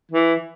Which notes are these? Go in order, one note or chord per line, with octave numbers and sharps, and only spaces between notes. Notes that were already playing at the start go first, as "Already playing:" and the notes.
E3